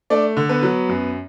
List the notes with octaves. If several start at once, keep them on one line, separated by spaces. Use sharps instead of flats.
A3 D4 D5
D3
B3 B4
F#3
F#2